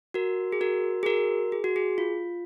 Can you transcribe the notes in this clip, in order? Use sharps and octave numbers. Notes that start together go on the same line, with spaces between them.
F#4 A#4
G#4
F#4 A#4
G#4
F#4 A#4
G#4
F#4
G#4
F4